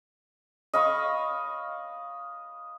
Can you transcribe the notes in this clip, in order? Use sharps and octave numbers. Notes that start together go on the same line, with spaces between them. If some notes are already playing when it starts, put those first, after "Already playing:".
D#5 F5 B5 C#6